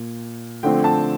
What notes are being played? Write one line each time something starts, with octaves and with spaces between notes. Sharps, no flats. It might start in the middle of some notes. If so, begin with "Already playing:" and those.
Already playing: A#2
D3 F3 A3 C4 G5
A5